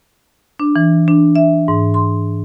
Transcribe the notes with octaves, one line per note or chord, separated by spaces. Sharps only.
D4
E3
D4
E5
G#2
C6